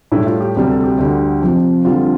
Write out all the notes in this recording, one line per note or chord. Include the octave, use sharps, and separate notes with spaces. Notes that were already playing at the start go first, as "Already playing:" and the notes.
A2 G3 E4
F4
G4
D2 C3 G3 G4
A4
G4
D2 D3 G3
F2 C3 F3
F2 D3 G3 F4